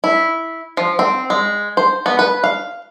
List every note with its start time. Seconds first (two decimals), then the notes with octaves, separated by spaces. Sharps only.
0.04 E4
0.77 F3
0.99 C4
1.30 G#3
1.77 C5
2.06 B3
2.19 B4
2.44 F5